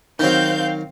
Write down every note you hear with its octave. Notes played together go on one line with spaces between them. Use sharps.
D#3 F#3 C4 F5 G6